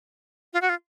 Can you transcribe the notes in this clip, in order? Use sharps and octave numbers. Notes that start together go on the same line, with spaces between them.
F4
F#4
F4